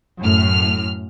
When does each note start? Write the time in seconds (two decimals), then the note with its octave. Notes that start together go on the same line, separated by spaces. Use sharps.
0.20 F#2 A2 F6